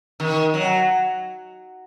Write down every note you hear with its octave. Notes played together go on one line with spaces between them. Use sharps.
D#3
F#3